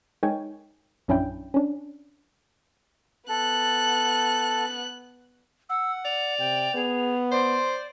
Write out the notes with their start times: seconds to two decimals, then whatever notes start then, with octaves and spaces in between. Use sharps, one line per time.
0.23 G#3 D#4 A#4 C#5 G5 G#5
1.08 A#1 F#2 C#4 D4 E4 G5
1.54 C#4 D4
3.29 B3 A4 F#6
5.69 F#5 E6
6.05 D5 F7
6.39 C3 G5
6.75 B3 G#4
7.32 C5 D5 C6